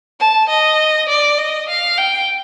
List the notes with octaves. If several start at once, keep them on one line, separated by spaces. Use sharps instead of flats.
A5
D#5
D5
D#5
F5
G5